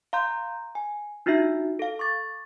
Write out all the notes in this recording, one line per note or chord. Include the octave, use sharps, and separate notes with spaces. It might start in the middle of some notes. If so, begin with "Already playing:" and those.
F5 A#5 C6 G6
G#5
D4 D#4 F4 F#4 E5
A4 F5
C#6 D6 A6